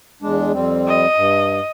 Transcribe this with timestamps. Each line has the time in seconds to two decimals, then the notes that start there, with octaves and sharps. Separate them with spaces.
0.22 E2 G#3 D4
0.53 F2 G3 C4
0.87 D#5
1.17 G2